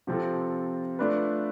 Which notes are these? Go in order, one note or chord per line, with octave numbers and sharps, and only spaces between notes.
C3 F3 C4 F4 A4
A3 D4 F4 B4